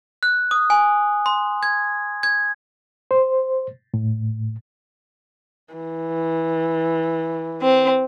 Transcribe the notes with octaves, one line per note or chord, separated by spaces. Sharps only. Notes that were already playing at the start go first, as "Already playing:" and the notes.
F#6
D#6
G#5
C6
G#6
G#6
C5
A2
E3
C4